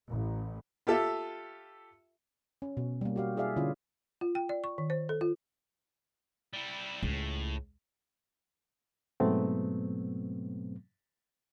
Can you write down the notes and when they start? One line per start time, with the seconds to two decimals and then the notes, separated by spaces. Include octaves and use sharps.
0.10 A1
0.87 F4 G4 A4 E5
2.62 C#4
2.77 B2
3.01 G3 A#3
3.16 F#4 G4 F5
3.37 E4 G#4 D5 E5 F5
3.56 D3 C#4 E4 F4
4.21 F4
4.35 G5
4.49 D5
4.64 C#6
4.78 D#3
4.90 C5
5.09 A4
5.21 F4
6.53 G3 E4
7.03 C#2 A2
9.20 G#2 B2 F#3 A3 B3 C4